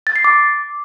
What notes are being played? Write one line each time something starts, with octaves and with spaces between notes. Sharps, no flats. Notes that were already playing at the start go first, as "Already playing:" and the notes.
A6
C7
D6